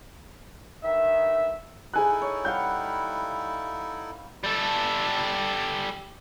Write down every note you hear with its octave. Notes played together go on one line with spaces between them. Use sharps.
G2 D#3 E5
D#4 E4 G#4 A4 G#5 F#6
C#5
G3 F5 F#5 G6
G3 A4